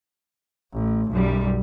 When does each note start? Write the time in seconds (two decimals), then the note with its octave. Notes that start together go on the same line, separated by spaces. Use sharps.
0.73 A1
1.11 B1 F#2 G3